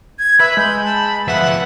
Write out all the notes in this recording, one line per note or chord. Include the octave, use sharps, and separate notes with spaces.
G#6
B4 E5 B5
G#3 G6
A5
F3 B3 E5 F#5